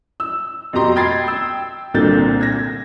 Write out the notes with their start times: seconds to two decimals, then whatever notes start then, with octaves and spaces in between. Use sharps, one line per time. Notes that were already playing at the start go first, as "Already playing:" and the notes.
0.20 E6
0.73 F2 B2 G4 A#5 C6
0.95 D#5 G5 B5 G#6 A6 C7
1.26 G5 E6
1.94 C2 A#2 D3 C4 G6 A6
2.41 G#6 A#6